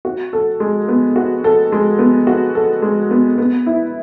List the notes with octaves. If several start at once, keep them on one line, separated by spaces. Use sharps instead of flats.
F#4
A4
G#3
B3
F#4
A4
G#3
B3
F#4
A4
G#3
B3
B3
E4